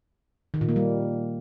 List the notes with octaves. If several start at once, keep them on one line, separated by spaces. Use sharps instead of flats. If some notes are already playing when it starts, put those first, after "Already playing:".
D#3
A#2
A#3
G3